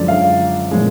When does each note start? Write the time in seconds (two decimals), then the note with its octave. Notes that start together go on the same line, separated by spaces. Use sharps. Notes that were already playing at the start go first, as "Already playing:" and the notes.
Already playing: F#2 D3 F3 G#3 D5
0.08 F5
0.71 A#2 F3 G#3